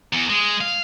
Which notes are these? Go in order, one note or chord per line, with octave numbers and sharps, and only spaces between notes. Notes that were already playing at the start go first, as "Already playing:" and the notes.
E2
G#3
F5